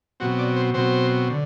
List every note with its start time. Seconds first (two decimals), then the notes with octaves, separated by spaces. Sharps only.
0.20 B2 F#3 C4 F#4
0.39 D5
0.56 C5
0.74 B2 F#3 C4 C5
1.30 D3